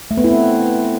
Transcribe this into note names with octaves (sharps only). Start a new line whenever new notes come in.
A3
B3
E4
C4